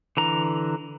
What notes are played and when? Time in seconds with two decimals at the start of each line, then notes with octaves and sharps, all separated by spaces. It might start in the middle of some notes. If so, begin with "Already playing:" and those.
0.17 D3 E3 A#5